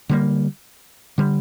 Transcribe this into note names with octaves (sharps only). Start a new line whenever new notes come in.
D3 G3 A#3
D3 G3